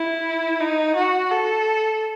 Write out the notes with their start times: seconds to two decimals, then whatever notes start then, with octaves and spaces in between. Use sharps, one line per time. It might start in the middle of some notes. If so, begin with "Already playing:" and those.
Already playing: E4
0.60 D#4
0.95 F#4
1.31 A4